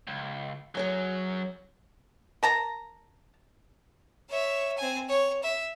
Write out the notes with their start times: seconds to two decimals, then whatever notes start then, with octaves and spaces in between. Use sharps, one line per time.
0.07 C#2
0.75 F#2 F#3 G#4 C#5 G#5
2.43 A#4 A5 A#5
4.29 C#5 E5
4.77 C4 G#5
5.09 C#5
5.43 E5